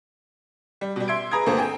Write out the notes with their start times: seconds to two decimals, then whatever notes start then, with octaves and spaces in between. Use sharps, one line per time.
0.81 G3
0.96 B2 G3
1.08 E5 C6 G#6 D7
1.31 G#4 B4 A#5 D#6 G#6
1.46 G1 D2 A#3 A4 C5
1.58 C4 G5 G#5